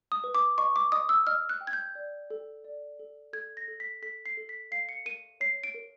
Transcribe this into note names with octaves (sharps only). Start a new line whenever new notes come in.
D#6
B4
D6
D#5 C#6
D6
D#5 D#6
E6
D#5 F6
F#6
G5
G#6
G6
D5
A4
D5
A4
A4 G#6
A#6
A4
B6
A4 B6
C7
A4
B6
F5 C7
C#7
A#4 D#7
C#5 C7
D7
A#4